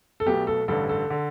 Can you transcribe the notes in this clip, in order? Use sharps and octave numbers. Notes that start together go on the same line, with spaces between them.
A4
B1 B2 A3 G4
A4
A1 G2 D3 A4
A4
D3